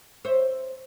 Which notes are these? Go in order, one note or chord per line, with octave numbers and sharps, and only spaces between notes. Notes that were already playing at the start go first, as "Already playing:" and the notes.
C5 C#5 E5